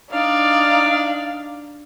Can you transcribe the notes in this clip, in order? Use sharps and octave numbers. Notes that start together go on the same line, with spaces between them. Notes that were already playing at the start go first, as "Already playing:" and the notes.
D4 D#4 D5 F5